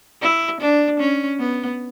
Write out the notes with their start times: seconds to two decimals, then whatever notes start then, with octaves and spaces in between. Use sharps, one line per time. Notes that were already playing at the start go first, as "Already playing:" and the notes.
0.21 E4
0.61 D4
0.99 C#4
1.40 B3